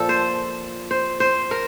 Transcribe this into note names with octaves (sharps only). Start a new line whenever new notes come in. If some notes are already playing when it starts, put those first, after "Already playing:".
Already playing: A#2 F3 A4
C5
C5
C5
A#4